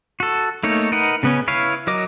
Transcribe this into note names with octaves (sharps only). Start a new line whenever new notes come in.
F#4 A4
A3 A#3 D#4 C#5
D#4 A#4 B4 D#5 F#5
C#3 B3 C#4
E4 B4 C#5 F5
F#3 A#4 D#5 D6